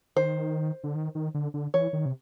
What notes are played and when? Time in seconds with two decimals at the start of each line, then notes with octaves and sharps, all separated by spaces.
0.16 D#3 C5
0.84 D3
0.95 D#3
1.15 D#3
1.34 D3
1.54 D3
1.74 E3 C#5
1.93 D#3
2.06 C3